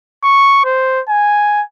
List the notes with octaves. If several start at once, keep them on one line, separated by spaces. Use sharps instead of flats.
C#6
C5
G#5